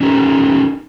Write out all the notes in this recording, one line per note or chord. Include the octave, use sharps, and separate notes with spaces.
C#4 D#4 G4 A4 A#4